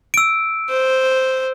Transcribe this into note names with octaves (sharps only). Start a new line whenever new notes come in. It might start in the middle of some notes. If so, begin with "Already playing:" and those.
E6 D7
C5